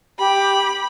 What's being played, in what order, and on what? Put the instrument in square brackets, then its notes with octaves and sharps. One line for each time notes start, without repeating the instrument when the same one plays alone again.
[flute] G4 [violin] B5